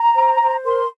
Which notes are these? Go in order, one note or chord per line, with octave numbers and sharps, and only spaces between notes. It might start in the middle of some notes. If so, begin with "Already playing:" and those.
Already playing: A#5
C5
C5
A#4 C6